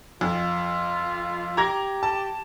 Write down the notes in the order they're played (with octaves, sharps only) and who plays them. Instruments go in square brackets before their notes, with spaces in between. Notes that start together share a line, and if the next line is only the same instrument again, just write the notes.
[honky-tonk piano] F2 [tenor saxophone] F4
[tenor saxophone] G4 [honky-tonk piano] A#5 G#6 A#6
[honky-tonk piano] A5